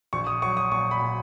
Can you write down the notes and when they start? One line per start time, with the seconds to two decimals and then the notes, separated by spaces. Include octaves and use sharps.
0.13 A#1 C#6
0.27 D#6
0.42 F#3 C#6
0.57 D#6
0.72 A#2 C#6
0.91 B5
1.01 A#2